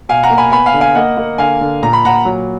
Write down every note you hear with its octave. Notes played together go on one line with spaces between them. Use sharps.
B2 F5 G#5
F#5 A#5
A#3
G#5 B5
B3 G#5 B5
F5 G#5
D3
F5 G#5
A#3 D#5 F#5
A#3
D3 F5 G#5
D3
A#2 A#5
B5
A#2 F#5 A#5
F#3